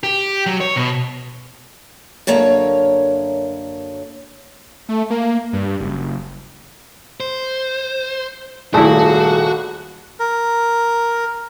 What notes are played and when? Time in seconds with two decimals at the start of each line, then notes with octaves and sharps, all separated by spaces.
0.03 G4
0.47 F#3
0.61 C#5
0.76 B2
2.27 F#2 D3 A#3 C#5
4.89 A3
5.10 A#3
5.53 G2
5.80 F#1
7.20 C5
8.74 D#1 C2 A3 E4 F#4 G#4 A5
10.20 A#4